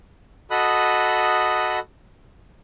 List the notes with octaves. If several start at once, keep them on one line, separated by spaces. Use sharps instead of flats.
F#4 A4 D#5 B5 D#6 F#6